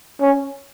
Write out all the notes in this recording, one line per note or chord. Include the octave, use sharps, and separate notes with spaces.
C#4